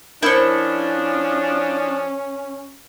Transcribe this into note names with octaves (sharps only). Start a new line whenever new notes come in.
F3 C#4 D4 E4 A#4 C5 C#6